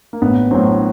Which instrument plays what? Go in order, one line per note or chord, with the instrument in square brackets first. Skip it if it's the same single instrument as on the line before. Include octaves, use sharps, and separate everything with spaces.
[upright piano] A#3
A1 B3
A2 F#3 C4